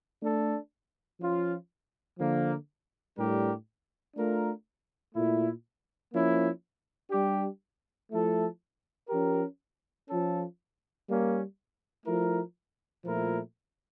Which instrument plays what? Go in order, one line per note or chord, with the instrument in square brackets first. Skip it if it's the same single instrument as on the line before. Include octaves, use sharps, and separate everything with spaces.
[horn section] A3 D4 A4
F3 C#4 F4
D3 F3 A#3
A2 G3 D4 G4 A#4
A3 D4 F4 A#4
A#2 A3 E4
F3 A#3 C#4 E4
G3 D4 G4
F3 A3 E4 A4
F3 C#4 G4 A#4
F3 C#4 F4 A4
G3 A#3 C#4
F3 A3 E4 A#4
A#2 F3 A3 E4 A#4